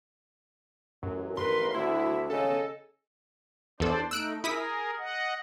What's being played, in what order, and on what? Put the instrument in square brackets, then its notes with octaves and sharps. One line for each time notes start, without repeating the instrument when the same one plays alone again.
[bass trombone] A1 [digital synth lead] F#2
[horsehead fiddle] A#4 B4 [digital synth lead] C6
[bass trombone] D2 [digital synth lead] E4 [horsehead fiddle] F#4 E5
[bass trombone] C#3 [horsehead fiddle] G#4 D#5 [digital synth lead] A4
[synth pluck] E2 A4 [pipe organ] D4 C5 D5
[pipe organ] A3 D#4 [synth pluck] E6 F#6 D7
[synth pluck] E4 D#6 B6 [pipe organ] G#4 A#4
[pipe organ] D#5 F#5